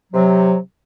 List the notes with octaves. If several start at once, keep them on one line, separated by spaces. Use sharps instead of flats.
C3 F#3